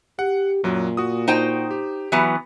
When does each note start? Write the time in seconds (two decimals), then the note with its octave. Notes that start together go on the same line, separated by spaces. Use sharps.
0.19 G4 F#5
0.64 F#2 A#2 F#3
0.97 F#4 D#6
1.28 D#4 C5 G5
1.71 G4
2.12 E3 F#3 B3